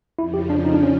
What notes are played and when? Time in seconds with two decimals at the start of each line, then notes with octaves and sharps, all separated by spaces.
0.18 F2 C#3 F3 E4
0.34 G4
0.50 D4
0.65 D#4
0.74 D4
0.83 C#4